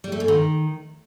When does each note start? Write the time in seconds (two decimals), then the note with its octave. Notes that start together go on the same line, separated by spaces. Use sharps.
0.04 G3
0.12 A3
0.20 G#2
0.28 D#3